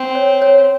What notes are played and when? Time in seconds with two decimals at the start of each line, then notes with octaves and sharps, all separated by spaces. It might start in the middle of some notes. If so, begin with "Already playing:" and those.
Already playing: C4
0.15 C#5
0.42 C#5